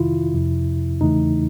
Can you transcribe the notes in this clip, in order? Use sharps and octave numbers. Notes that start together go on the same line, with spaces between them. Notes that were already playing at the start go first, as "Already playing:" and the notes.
Already playing: F2 C3 D#3 E4 F4
F2 C3 F3
E2 C#3 E3 A3 D#4